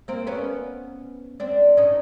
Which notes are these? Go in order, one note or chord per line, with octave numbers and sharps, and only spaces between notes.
A#3 C4
B3 C#4
C4 D4
C#4 D#4